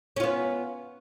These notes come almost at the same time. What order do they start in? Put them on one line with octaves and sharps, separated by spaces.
C#4 F4 B3